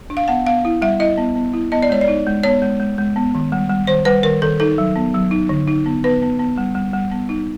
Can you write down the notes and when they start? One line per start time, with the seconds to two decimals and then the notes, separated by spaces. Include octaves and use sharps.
0.10 D4
0.17 F5
0.28 B3 F#5
0.46 B3 F5
0.65 E4
0.82 G3 E5
1.00 E4 D#5
1.18 B3
1.36 B3
1.54 E4
1.72 B3 D#5
1.82 D5
1.90 G#3 C#5
2.01 D5
2.08 D#4
2.27 G#3
2.43 B3 C#5
2.62 G#3
2.80 G#3
2.98 G#3
3.16 B3
3.35 D#3
3.52 G3
3.70 G3
3.87 D#3 C5
4.05 G3 B4
4.23 D#3 A#4
4.42 D#3 A4
4.60 D#4 A4
4.78 F#3
4.96 B3
5.14 F#3
5.31 D#4
5.49 D3
5.68 D#4
5.86 B3
6.04 B3 B4
6.22 B3
6.39 B3
6.58 G3
6.75 G3
6.93 G3
7.11 B3
7.29 D#4